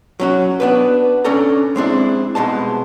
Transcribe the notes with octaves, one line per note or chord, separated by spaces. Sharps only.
F#3 C#4 F#4
B3 D4 B4
C#4 D4 A4 A#5
G#3 C4 D4 E4
C2 B2 G#3 A5